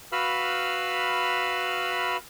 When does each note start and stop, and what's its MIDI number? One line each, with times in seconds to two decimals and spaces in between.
0.12 2.17 66
0.12 2.17 71
0.12 2.17 77
0.12 2.17 83
0.12 2.17 88
0.12 2.17 89